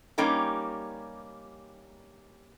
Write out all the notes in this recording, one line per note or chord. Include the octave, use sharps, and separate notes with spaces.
G3 A#3 C#4 D#4 G4